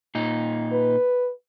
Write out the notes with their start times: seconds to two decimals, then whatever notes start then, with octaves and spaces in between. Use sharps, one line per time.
0.15 A#2 D#4
0.72 B4